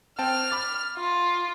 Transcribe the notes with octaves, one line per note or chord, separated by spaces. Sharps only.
C4 G5 A5 F6
B5 D6 A6
F4